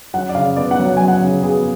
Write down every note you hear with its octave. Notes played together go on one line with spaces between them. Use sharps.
F#2 F#5
D5
C#3 F5
B3 D5
F#5
F#3
F#5
F#2 G#5
F#5
C#3
B3 G#4